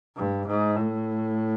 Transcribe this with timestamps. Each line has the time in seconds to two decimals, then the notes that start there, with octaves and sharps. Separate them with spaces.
0.16 G2
0.47 G#2
0.76 A2